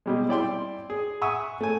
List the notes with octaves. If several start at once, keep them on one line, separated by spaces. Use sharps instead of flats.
B2 G3 G#3
E4 D5 G5 C6
G#4
E5 F#5 G#5 C#6 D#6 E6
A3 G#5